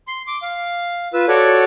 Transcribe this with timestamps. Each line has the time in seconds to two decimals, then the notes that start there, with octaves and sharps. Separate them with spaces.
0.08 C6
0.27 D6
0.42 F5
1.13 F4 B4 E6
1.28 F#4 A4 C#5 D5